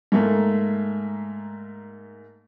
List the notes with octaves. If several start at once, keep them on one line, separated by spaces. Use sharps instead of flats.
G#2 A3 A#3